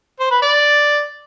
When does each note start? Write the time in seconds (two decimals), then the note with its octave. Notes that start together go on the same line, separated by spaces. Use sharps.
0.20 C5
0.31 B4
0.42 D5